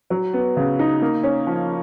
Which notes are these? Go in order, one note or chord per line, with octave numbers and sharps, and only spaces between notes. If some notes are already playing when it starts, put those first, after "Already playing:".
F#3
B3
C#3
D#4
A#3
C#4
F3